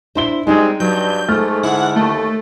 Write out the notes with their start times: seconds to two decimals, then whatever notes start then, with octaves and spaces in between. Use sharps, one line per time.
0.15 D4 E4 C5 C6 G7
0.47 G3 G#3 C4 D#4
0.80 G2 F#3 G6
1.29 G#2 A3 F6
1.63 D3 E4 F#5
1.96 D#2 A3